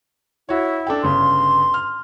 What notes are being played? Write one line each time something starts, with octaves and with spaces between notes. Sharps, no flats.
E4 F#4 C#5
D4 A4 G5
G1 C#3 C6
F6